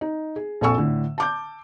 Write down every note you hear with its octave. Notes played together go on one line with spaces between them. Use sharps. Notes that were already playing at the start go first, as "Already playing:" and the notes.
D#4
G#4
A#1 F2 A4 G#5 C#6 E6
A2 D3
A5 D6 G6